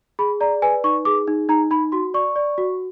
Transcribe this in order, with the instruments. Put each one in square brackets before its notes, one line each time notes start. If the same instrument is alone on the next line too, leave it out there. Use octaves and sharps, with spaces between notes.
[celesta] G#4 B5
D5 A#5
B4 G#5
D#4 C#6
G#4 D6
D#4
D#4 A#5
D#4 B5
F#4 C6
D5 C#6
D5
F#4